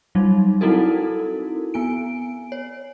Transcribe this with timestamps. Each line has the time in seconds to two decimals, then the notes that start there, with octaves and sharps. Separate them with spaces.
0.15 F#3 G3 D#4
0.61 C4 D#4 E4 F#4 A4 A#4
1.74 B3 G#5 D7
2.52 C#5